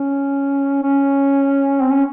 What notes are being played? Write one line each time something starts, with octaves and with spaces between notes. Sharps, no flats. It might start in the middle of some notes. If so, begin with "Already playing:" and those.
Already playing: C#4
C#4
C4
C#4